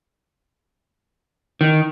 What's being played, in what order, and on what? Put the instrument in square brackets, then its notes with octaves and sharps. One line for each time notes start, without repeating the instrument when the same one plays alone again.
[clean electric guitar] D#3